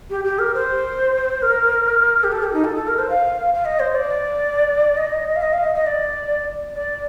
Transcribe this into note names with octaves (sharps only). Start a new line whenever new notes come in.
G4
G4
A#4
C5
A#4
G4
A4
G4
D#4
A4
A4
A#4
C5
F5
F5
D#5
C5
D5
D#5
F5
D#5
F5
D#5
D#5
D5
D5